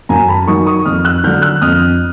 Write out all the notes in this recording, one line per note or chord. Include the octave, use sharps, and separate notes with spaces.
F#2 G#5 A#5
A5 B5
D#3 F#3 C#6 D#6
C#6 D#6
F2 D#6 F6
E6 F#6
D3 F#3 F6 G6
E6 F#6
F2 D#6 F6